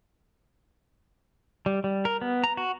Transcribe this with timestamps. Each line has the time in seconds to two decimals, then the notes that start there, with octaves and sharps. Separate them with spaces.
1.66 G3
1.84 G3
2.05 A#4
2.21 B3
2.44 A#5
2.57 F#4